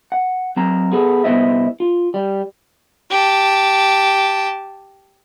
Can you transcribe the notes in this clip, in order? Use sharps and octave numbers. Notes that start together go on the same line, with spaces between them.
F#5
F#3 C4 A#5
B3 G#4 A4
C2 B3 E4 C5 D#5 E5
F4
G3
G4 A5